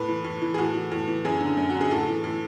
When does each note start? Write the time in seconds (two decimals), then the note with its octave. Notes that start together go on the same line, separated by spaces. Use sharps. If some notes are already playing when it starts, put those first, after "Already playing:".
Already playing: A2 B4
0.08 E3
0.24 A2
0.42 E3
0.54 G#4
0.58 A2 F#4
0.74 E3
0.92 A2
1.08 E3
1.24 F#2 G#4
1.40 D3
1.57 F#2
1.70 D3 F#4
1.81 G#4
1.91 A2 A4
2.08 E3
2.24 A2